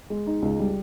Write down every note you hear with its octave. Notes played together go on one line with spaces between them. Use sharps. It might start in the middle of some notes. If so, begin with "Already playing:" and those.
G#3
D#4
C#2
G3